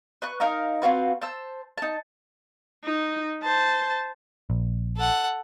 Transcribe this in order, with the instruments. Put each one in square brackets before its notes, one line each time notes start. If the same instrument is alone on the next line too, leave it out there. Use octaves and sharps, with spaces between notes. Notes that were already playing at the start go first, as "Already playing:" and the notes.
[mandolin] B4 C#6 F#6
D#4 A#4 F5 A#5
C4 F4 F#4 B4
C5 A5 E6
D#4 A5
[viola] D#4
C5 A5
[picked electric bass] A#1
[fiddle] A4 F#5